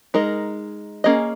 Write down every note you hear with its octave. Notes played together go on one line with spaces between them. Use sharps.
G#3 D#4 A#4 D#5
A#3 C#4 G#4 D#5